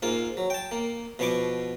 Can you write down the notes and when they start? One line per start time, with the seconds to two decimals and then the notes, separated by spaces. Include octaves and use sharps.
0.02 G#2 A#3 F4
0.37 F#3
0.50 G5 A5
0.71 A#3
1.19 B2 F3 B3 C#6 D6